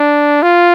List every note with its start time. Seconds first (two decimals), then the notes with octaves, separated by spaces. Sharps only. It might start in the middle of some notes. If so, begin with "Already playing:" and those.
Already playing: D4
0.43 F4